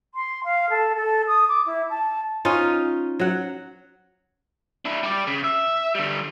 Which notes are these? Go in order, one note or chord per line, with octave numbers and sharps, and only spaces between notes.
C6
F5
A4
A4
D#6
D6
E4
A5
C#4 D#4 F4
F#3 F#5
D4 E4
G3 D5
C#3
E5
D3 G3